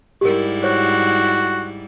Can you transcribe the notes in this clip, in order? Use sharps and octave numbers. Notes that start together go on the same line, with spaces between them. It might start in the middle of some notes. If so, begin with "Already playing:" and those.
G#2 G3 E4 G4 A#4
F#4 C5 C#5